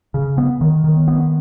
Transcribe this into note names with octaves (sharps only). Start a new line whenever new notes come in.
C#3
B3
D#3
D#3
B3